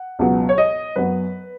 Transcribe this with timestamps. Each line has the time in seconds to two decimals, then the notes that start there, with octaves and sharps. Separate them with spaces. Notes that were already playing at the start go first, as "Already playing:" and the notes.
Already playing: F#5
0.19 C#2 B2 F#3 B3
0.49 C#5
0.58 D#5
0.96 F#2 F#3 B3 B4